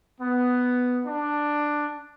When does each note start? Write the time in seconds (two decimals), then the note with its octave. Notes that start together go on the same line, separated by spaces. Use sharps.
0.20 B3
1.06 D4